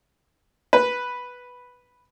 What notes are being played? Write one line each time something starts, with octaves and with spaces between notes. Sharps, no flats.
B4